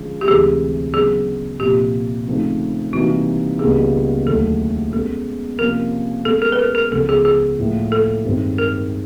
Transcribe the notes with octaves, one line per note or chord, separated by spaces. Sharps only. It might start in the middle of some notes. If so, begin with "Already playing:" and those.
Already playing: D3 F3 G#3 C#4
G4
D2 C3 E3 G#3 C4 G#4
C#3 F#3 B3 D4 G#4
C2 A#2 F3 G4
C#3 F3 A3 C4 D#4
C3 E3 G3 A#3 D#4 F#4
C#2 B2 G3 A#3 D4 G#4
D#2 D3 F#3 A3 A4
B2 G#3 C#4 A4
C3 F3 A#3 C#4 A#4
B2 G#3 C#4 A4
A#4
B4
A#4
A#4
C#2 C#3 F3 G#3 B3 A4
G#4
G#4
A2 F3 A#3
A4
G2 D#3 G#3 C4 D#4
A#4